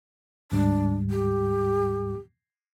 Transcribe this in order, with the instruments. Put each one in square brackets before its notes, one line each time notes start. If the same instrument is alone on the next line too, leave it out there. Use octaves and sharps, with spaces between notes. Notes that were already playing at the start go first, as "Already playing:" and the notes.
[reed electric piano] D2 G#2 G3 [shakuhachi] D4
[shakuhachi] G4